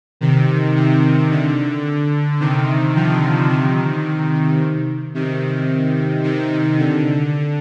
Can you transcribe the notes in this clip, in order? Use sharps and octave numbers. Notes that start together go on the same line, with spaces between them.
C3 D#3
C3
D3
C3 D#3
D3 F3
C3 D#3
C3 D#3
C3 D#3
D3